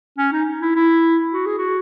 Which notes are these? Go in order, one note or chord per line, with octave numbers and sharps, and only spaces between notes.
C#4
D#4
E4
E4
F#4
G#4
F#4